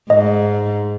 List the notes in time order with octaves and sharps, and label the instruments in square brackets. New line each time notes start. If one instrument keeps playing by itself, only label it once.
[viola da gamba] G#2 [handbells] D#5